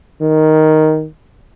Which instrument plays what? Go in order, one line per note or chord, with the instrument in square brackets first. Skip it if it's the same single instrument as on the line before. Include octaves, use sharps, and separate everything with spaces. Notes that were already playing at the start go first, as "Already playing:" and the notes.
[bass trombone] D#3